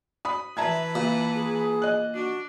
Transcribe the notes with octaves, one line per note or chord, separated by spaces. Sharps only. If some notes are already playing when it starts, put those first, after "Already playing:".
B5 D#6
E3 B4 E5 A5 A#5 G#6
A#2
G#4
D#5 F#6
D4 F#4